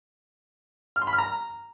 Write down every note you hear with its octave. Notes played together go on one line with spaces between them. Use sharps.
F6
C6
B5
F6
A#5